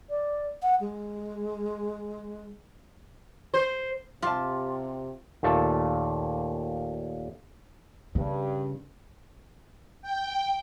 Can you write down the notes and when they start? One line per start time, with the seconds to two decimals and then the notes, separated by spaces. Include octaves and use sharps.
0.10 D5
0.63 F#5
0.80 G#3
3.54 C5
4.22 C3 F4 G4 A5
5.43 D#2 A#2 A3 A5
8.15 G2 C#3 C#4
10.02 G5